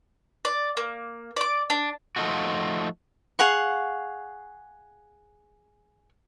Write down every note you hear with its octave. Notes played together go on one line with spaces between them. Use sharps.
D5
A#3
D5 D6
D4
F3 A3 D#4 F4 F#4
G#4 F5 F#5 C#6